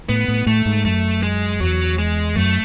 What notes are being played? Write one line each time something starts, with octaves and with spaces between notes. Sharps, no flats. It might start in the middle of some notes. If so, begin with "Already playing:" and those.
A2 B3
A2
A2 A3
G#2
F#2 A3
G#3
E2 F#3
G#3
F#2 A3